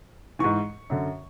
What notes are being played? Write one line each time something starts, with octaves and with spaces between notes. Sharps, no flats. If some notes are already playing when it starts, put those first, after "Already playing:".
G#2 E3 C#6
F#2 D3